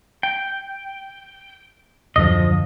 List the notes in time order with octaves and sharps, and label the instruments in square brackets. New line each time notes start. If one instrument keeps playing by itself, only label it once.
[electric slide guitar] G5
[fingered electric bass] D#1 F#2 D3 [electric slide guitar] F3 D#5